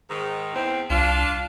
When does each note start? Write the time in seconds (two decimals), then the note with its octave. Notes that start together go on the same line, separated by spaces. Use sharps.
0.09 G#2 D#3
0.55 E2 C4
0.90 C2 D4 F4